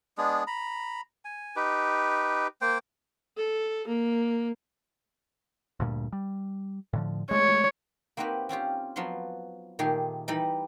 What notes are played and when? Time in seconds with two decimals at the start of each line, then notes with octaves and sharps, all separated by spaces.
0.18 G#3 B3 D4 G#4
0.47 A#5 B5
1.25 G#5
1.56 D#4 G4 B4
2.61 A#3 C5 G5
3.37 A4
3.87 A#3
5.80 D2 G2 A#2
6.13 G3
6.93 A2 D3 F3
7.31 G#3 A3 C#5
8.17 A#3 C4 D#4 F#4 G4 B4
8.49 C4 C#4 F4 G4
8.96 F3 F#3 B3 F5 C6
9.79 A#2 D#3 A3 G4 G#4
10.28 E3 G3 D#4 E4 D#5 B5